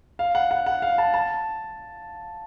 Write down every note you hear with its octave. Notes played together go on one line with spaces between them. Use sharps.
F5
F#5
F#5
F#5
F5
A5
A5